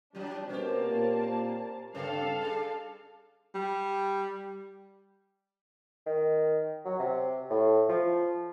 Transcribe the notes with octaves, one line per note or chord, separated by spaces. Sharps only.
E3 F#3 G3 D4 D#4
B2 A#3 C4 C#4 G4 A5
A#2
G2 C#3 C4 D4 A4 F5
G3 D4 G#4
G3
D#3
F#3
C3
A2
F3